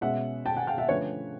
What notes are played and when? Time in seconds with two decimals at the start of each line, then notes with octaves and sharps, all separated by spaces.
0.01 B2 G#3 C#4 E5 F#5
0.46 G5 A5
0.56 F#5 G#5
0.67 F5 G5
0.78 E5 F#5
0.89 D3 F3 A3 C#4 B4 C#5